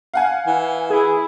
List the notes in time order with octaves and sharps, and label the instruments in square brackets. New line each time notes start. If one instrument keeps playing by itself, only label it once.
[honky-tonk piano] F5 F#5 G#5
[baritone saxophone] E3
[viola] E4 [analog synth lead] G#4